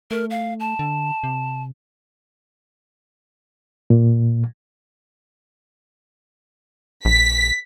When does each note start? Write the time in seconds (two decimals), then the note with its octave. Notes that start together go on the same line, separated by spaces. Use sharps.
0.11 A3 A#4
0.30 F5
0.60 A5
0.79 D3
1.24 C3
3.90 A#2
7.05 A#1 B6